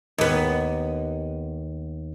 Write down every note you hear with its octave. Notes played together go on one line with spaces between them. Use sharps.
D#2 B3